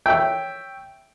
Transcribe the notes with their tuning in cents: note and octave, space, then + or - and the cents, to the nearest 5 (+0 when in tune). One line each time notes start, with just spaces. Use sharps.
C#5 +0 E5 +0 G5 +0